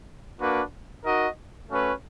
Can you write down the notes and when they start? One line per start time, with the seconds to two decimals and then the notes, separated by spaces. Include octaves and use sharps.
0.39 A#3 D4 F#4 B4
1.05 D#4 F#4 A#4 D#5
1.70 A3 C#4 F#4 B4